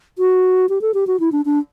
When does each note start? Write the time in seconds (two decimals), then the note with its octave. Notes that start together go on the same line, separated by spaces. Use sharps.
0.19 F#4
0.69 G4
0.81 A4
0.94 G4
1.07 F#4
1.20 E4
1.32 D4
1.45 D4